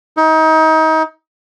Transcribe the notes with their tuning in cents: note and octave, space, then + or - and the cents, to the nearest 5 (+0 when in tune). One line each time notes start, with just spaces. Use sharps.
D#4 +30